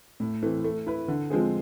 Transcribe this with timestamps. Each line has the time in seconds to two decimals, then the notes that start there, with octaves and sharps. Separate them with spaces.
0.20 A2
0.42 E3 A3 C4
0.64 A3
0.87 E4 B4
1.08 D3
1.30 F3 G#3 C4 G#4